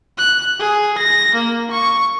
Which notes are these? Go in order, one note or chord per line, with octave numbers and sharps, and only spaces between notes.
F#6
G#4
A#6
A#3
C#6